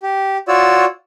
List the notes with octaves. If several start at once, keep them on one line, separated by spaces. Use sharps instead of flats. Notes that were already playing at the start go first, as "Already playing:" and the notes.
G4
F4 F#4 C#5 D5 E6